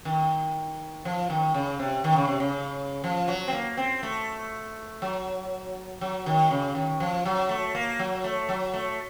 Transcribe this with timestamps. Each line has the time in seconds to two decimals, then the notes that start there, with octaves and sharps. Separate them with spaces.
0.05 D#3
1.05 F3
1.30 D#3
1.54 C#3
1.79 C3
2.04 D#3
2.16 C#3
2.28 C3
2.40 C#3
3.04 F3
3.28 F#3
3.48 C4
3.53 A#3
3.77 C4
4.03 A3
5.02 F#3
6.01 F#3
6.26 D#3
6.51 C#3
6.75 D#3
7.00 F3
7.25 F#3
7.49 A3
7.75 A#3
7.99 F#3
8.24 A3
8.49 F#3
8.74 A3